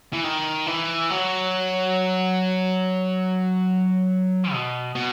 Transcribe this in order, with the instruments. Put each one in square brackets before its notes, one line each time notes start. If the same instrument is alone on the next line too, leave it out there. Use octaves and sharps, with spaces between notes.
[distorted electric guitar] E3
D#3
E3
F#3
B2
B2